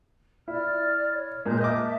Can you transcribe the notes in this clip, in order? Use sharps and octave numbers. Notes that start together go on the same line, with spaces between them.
E4 D5 F6
C#5
A#2 G#3 A#3 A#4 G6
A#4 D#5 E5 A5 D6